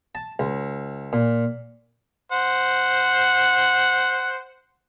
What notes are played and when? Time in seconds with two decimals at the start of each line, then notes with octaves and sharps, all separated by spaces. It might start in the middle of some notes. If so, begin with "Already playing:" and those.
0.15 A5
0.39 C#2
1.13 A#2
2.32 C5 F#5